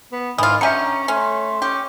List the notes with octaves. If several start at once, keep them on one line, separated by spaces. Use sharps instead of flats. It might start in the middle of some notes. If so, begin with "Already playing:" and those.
B3
G#2 D#3 E3 F4 D#6
D3 C#4 G4 E5 G#5 A#5 C#7
A3 C#4 C6
C#4 G4